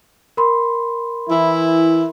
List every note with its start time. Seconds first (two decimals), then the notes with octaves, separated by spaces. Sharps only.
0.37 A#4 B5 C6
1.29 E3 E4